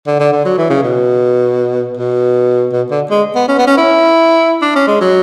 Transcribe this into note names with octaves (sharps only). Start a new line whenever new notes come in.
D3
D3
D3
F#3
E3
C#3
B2
B2
B2
D3
G#3
B3
C#4
B3
C#4
E4
D4
C#4
G#3
F#3